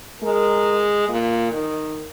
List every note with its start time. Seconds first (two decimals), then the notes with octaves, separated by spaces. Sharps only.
0.22 G#3 A#4
1.09 A#2
1.51 D#3